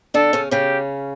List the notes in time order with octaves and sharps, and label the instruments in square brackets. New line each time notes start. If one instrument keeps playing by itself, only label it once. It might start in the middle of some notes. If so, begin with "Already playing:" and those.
[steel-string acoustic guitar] D3 D4 [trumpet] A4
[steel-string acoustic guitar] C#3 C#4
[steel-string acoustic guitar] C#3 C#4 [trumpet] G4